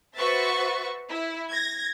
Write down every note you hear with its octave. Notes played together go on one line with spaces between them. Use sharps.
F#4 B4 C5 E5 C#6 A6
E4
G#6 A#6